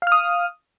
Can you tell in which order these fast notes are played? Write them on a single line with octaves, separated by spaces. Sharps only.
F5 F6 D#6